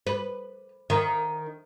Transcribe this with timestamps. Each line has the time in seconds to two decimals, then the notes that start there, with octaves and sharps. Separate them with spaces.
0.07 B4
0.90 D#3